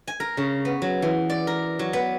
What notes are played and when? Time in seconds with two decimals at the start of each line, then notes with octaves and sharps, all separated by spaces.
0.07 G#5
0.20 A#4
0.37 C#3
0.65 B3
0.82 F#3
1.02 E3
1.30 D5
1.47 A#4
1.79 F#3
1.93 B3